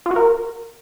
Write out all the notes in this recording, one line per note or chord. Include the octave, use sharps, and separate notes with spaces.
F4
F#4
A#4